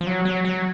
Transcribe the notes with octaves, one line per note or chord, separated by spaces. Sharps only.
F3
F#3
F#3
F#3